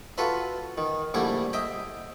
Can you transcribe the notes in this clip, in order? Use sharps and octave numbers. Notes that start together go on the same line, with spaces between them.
F4 F#4 A4 B4 E5
D#3
A#1 D3 G3 A3 E4 G#5
D#5 E5 G5